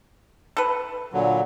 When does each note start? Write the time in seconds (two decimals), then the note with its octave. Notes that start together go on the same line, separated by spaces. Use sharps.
0.57 A4 B4
1.13 A#2 D3 F#3